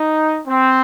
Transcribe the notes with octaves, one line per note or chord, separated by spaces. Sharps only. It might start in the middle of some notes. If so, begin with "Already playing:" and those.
Already playing: D#4
C4